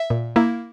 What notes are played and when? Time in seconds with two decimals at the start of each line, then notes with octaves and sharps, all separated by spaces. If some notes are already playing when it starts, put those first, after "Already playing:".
Already playing: E5
0.10 A#2
0.36 A#3 E4